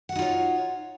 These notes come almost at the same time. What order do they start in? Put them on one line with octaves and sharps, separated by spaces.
F#5 F#4 D#4 F4 C#5